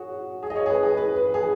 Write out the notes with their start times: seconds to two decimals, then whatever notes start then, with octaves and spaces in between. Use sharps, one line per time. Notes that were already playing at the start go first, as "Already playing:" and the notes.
Already playing: F#4 G#4 C#5
0.43 G#4
0.50 D#5
0.56 C#5
0.66 G#4
0.70 B4
0.83 G#4
0.97 B4
1.16 B4
1.34 G#4